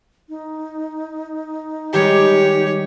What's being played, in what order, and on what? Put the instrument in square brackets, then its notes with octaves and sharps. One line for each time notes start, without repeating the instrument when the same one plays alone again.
[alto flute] D#4
[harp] D#3 G3 G#3 [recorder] G4 [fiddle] C#5